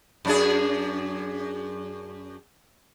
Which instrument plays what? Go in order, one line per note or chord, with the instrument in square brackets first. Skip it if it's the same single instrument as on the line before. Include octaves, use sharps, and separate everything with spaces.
[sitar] F#2 D4 G#4